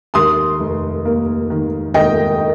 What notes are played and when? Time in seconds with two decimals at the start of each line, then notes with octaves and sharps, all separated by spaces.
0.14 D#2 C6 D#6
0.60 F1
1.05 A#3
1.50 D#3
1.94 D#2 D#5 G5